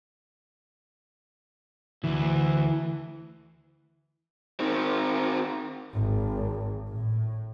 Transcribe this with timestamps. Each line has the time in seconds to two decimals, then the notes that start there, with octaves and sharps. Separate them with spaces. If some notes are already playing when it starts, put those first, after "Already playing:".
2.04 D2 E3
4.60 D#3 C4
5.93 G#1
6.89 A2